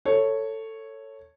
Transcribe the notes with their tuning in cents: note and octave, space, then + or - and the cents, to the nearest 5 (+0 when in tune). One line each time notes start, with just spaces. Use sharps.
A4 +15 C#5 -5